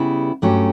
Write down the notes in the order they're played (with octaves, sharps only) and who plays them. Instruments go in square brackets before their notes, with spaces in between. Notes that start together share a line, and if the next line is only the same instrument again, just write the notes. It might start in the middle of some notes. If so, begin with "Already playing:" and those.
Already playing: [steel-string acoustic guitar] C#3 G3 B3 E4
G2 F#3 A3 C#4 G4